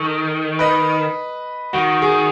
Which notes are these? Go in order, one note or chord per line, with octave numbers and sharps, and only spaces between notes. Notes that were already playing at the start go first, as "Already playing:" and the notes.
Already playing: D#3 A4
B4 D#5
D#3 F#4
G#4